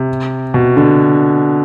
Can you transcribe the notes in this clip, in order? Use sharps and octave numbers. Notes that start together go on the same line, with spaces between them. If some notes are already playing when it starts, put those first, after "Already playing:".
Already playing: C3
B2
D3